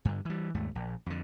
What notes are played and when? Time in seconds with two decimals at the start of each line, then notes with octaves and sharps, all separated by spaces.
0.05 G2 D3
0.25 E3 G3
0.54 D#2 G#2 A3
0.75 A#1
1.06 F2 D3